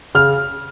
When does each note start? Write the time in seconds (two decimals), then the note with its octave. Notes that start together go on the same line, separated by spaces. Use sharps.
0.15 C#3 F6